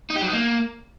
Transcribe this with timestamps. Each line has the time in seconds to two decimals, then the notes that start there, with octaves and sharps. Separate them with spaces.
0.10 D#4
0.16 G4
0.22 F#3
0.27 D#4
0.33 A#3